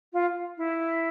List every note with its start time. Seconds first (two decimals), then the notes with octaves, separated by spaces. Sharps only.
0.13 F4
0.57 E4